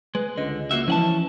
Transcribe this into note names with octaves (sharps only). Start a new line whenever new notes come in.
G#3 B4
C#2 D3 D#5
A#3 F#4 E5
E3 F3 C#4 F#5 A5